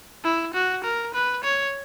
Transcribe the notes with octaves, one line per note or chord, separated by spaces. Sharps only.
E4
F#4
A#4
B4
C#5